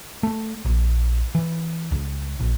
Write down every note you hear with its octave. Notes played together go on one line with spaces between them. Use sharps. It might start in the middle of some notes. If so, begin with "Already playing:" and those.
A3
A#1
E3
C#2
A#1